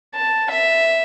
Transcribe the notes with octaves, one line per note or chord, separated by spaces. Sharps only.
A5
E5